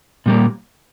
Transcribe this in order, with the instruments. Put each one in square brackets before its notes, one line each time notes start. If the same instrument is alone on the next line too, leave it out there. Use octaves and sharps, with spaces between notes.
[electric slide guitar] A#2 G3 A#3